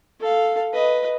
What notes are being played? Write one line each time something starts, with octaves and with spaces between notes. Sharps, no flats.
A4 F5
B4 D#5